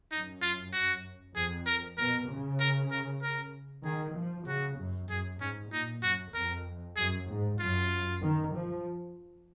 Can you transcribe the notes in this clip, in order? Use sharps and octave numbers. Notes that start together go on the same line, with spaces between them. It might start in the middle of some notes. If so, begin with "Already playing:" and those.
F#2 D#4
F4
F#4
F2 G#4
A#4
B2 A#4
C#3
A#4
A#4
A#4
D#3 G#4
F3
C#3 F#4
F#2
F#2 G#4
G#2 C#4
A#2 D#4
F#2 F#4
F2 A#4
F#2 G#4
G#2
F#2 F4
D#3
F3